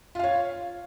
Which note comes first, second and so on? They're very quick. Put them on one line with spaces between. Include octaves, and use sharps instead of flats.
F4 F5 C#5